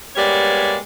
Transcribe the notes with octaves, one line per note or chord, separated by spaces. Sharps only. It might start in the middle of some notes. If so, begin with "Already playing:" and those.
G3 G#3 A#3 B3 C#5 D5